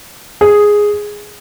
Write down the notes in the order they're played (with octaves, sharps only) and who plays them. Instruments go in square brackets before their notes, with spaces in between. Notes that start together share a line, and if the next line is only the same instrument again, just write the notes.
[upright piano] G#4